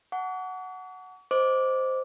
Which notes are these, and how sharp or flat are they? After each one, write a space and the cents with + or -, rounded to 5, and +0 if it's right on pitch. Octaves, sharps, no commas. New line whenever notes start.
F#5 +0 A5 +0 C#6 +45
C5 -5 D#5 +0 D6 -10